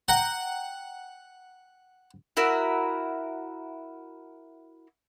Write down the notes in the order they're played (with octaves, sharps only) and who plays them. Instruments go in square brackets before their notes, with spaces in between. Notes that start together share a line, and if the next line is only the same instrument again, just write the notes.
[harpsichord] F#5 [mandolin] G5 A#5
[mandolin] E4 F#4 A#4 E5